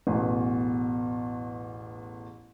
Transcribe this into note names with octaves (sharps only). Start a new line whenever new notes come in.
A1 E2 B2